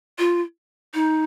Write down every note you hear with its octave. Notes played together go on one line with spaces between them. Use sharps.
F4
D#4